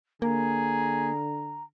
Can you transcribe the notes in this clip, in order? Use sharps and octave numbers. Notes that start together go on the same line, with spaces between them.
D3 A#3 G#4 A#5